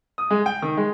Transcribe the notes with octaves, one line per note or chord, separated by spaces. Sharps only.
D#6
G#3
G5
D#3
G#3